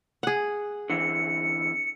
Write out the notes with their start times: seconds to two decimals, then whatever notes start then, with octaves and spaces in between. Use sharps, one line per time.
0.23 G#4 F#5
0.90 D3 E3 C4 C#7